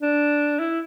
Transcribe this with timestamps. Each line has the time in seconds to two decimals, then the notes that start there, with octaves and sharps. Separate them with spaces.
0.02 D4
0.59 E4